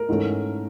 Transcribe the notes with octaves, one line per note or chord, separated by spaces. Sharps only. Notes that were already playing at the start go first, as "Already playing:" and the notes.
Already playing: A#4
G#2 E3 A3 C#4